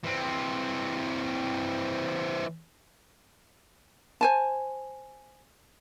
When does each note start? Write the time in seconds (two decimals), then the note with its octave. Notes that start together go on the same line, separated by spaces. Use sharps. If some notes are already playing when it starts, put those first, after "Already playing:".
0.04 E3 C4
4.21 C5 G#5 A5